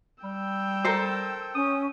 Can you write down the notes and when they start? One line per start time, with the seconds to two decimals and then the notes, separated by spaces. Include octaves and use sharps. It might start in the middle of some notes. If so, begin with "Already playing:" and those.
0.24 G3 G5 E6
0.84 A4 A#4 C5
1.55 C#4 D#6